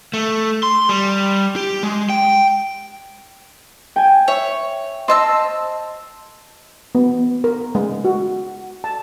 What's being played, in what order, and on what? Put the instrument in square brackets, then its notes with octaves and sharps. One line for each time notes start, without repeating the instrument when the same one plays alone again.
[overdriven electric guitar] A3
C6
G3
G4
G#3
G5
[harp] G5 G#5
[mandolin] C#5 [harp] E5
[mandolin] C4 A5 E6 [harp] D#5 C6
[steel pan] B3
A#4
G#3
F#4
A5